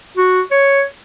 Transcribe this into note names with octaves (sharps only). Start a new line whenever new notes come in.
F#4
C#5